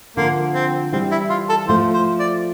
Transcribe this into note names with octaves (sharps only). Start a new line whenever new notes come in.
D3 F3 A#3
C4
E3 G3 C4
E4
F4
A4
F3 A3 C5
C5
D5